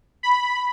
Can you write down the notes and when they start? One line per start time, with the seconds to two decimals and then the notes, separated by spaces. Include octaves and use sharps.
0.23 B5